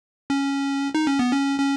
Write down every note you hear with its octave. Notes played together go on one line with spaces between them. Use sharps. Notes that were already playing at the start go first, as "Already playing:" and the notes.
C#4
D#4
C#4
B3
C#4
C#4